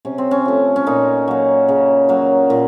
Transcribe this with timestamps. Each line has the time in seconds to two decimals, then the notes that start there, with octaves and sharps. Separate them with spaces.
0.05 C3 C#4
0.18 C4
0.31 C#4
0.45 F3 A3
0.76 C#4
0.87 A#2 D#4
1.28 F#3 A#3
1.69 C#3
2.09 F#3 A#3
2.50 A#2